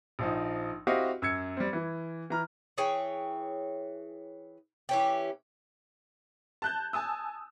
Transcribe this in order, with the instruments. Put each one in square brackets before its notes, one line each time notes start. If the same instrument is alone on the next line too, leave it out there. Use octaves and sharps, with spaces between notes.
[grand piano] A#1 F3 D#4
C4 E4 F#4 G4 D#5 F5
F#2 E6 G#6 C#7
G3 C4
E3
E3 A#5 F6
[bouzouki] E3 G#4 C#5 G5
E3 C#4 G4
[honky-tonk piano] A5 F#6 G6
G#5 A5 D#6 E6